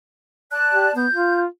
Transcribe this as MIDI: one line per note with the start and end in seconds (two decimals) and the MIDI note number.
0.51 0.92 74
0.51 0.92 81
0.51 0.92 90
0.74 0.88 67
0.95 1.07 59
0.95 1.40 91
1.13 1.45 65